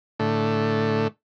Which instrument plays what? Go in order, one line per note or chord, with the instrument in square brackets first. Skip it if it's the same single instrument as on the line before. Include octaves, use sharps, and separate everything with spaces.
[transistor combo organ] A2 D3 A3